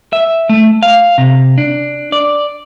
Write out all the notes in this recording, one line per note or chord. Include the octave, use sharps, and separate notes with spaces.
E5
A3
F5
C3
D4
D5